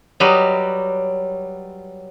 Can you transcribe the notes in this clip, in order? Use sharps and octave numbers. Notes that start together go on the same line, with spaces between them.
F#3 G3 G4 B4 D#5